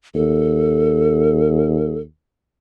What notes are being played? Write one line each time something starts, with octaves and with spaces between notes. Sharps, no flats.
D#2 A4